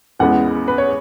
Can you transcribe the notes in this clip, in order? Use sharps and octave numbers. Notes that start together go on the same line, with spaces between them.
E2 C#3 G#3 B3 F#5
B4
C#5